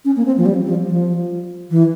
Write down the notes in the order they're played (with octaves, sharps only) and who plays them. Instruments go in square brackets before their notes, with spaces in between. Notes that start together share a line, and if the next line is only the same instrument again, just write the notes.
[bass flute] C#4
A#3
C4
F3
G3
F3
F3
E3